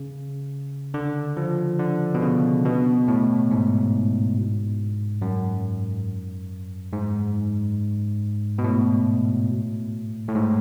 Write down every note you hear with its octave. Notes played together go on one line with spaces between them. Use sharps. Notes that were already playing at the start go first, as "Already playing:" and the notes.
Already playing: C#3
D3
F3
D3
B2
C#3
B2
A2
G#2
F#2
G#2
B2
A2
A2
G#2